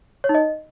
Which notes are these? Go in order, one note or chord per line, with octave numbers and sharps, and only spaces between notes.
C#5
D#4
D#5